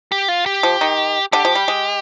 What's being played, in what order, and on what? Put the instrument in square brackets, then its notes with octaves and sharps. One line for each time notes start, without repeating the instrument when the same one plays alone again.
[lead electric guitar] G4
F4
G4
[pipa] F3
D#3
[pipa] D3 [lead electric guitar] G4
[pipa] F3
G3
G#3